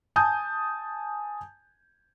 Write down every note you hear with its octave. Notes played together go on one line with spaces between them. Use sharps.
G#5 A5 D#6 G6